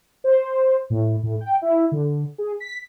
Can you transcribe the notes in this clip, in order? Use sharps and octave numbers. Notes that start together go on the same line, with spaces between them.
C5
A2
A2
G5
E4
D3
G#4
B6